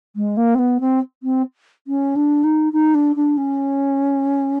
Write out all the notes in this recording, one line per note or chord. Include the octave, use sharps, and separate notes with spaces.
G#3
A#3
C4
B3
C4
C4
C#4
D4
D#4
D#4
D4
D4
C#4